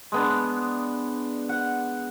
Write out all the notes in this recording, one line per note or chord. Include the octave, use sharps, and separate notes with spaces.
G#3 B3 D4
F#5